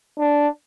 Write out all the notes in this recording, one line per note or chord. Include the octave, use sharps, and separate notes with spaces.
D4